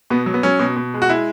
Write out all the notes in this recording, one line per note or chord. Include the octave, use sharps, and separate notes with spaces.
B2 B3
F#3
B3
F#3 C#4
B2
B2
G#3
F#4
G#3 E4